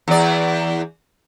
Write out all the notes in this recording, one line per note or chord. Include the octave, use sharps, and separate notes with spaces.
E2 D5